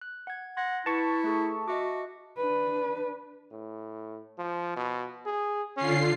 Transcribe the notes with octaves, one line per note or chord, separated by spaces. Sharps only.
F#6
F#5 G#6
F#5 C6 G#6 A#6
E4 B4 A5 C#6
A3 G#4 A4
F#4 D#5 E5 D6
D4 B4
A2
F3
B2
G#4
D3 C#4 F4 C7